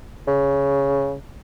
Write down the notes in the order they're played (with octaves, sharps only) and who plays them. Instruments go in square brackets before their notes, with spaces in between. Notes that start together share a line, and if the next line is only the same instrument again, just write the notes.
[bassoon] C#3